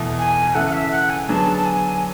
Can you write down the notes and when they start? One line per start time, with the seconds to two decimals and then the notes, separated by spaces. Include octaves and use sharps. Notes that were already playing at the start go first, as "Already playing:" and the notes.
Already playing: E2 B2 A3
0.19 G#5
0.55 C#3 E3 A3 E4 A4 F#5
0.67 F#5
0.73 E5
0.91 F#5
1.10 G#5
1.29 D3 F#3 B3 D4 G#4 A5
1.58 A5
1.65 G#5